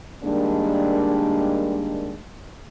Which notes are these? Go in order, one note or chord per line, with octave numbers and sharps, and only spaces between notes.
D#3 G3 G#3 A#3 D4